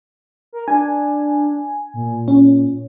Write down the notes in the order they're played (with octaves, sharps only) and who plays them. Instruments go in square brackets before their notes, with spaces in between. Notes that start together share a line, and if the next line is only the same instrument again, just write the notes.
[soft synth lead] A#4
[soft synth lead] D4 [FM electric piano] G#5
[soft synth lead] A#2
[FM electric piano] C#4